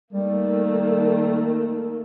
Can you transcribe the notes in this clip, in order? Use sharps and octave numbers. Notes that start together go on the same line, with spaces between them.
D#3 G3 A3 A#3